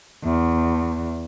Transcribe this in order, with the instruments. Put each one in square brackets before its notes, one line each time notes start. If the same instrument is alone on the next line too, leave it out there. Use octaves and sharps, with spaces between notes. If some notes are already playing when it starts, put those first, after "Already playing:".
[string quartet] E2